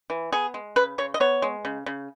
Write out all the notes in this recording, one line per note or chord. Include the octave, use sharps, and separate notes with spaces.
E3
B3 G#4
G#3
C#3 B4
C#3 C#5
D#5
B3 C#5
G#3
C#3
C#3